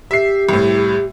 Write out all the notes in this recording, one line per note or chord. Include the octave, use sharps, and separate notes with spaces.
G4 E5 C7
C2 A2